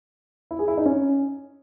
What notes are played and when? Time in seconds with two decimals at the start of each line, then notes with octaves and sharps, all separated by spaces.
0.51 E4
0.59 G#4
0.68 E4
0.78 D#4
0.86 C#4